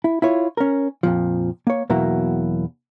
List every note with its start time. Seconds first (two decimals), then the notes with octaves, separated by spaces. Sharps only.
0.04 E4
0.22 E4 F4 C#5
0.57 C#4 A#4
1.03 F2 A#2 F3
1.67 A#3 C#5
1.90 E2 B2 F#3 A#3 E4 A#5